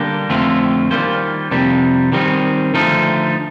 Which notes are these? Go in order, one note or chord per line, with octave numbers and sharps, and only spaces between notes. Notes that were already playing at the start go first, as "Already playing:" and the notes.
Already playing: D3 G3 A#3 D4 G4
F2 D3 A3 C4 F4
D#3 G3 A#3 F4 C5
F2 C3 G3
D#3 G3 C4 D#4
D3 F3 A3 D#4